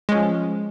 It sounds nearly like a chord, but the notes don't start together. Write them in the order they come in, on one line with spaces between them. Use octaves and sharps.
G#3 C#4 F3